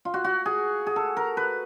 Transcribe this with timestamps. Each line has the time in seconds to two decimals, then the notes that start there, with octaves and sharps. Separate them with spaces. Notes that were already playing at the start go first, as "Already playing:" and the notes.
0.05 F4
0.14 F#4
0.24 F#4
0.46 G#4
0.87 G#4
0.96 A4
1.17 A#4
1.37 B4